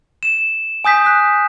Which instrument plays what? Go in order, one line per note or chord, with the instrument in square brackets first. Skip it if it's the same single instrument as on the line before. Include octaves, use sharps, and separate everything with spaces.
[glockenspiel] E7
G#5 D#6 G6 B6
F#6